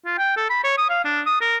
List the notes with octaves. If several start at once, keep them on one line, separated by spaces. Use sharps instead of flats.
F4
G5
A4
B5
C#5
D#6
F5
D4
D#6
A#4